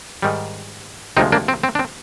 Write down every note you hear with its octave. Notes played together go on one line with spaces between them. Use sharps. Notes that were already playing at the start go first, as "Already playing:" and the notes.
G#2 D#3 G3
D2 C3 F3 G#3 C4 D#4
A#3 D4
C4
C4
D4
C4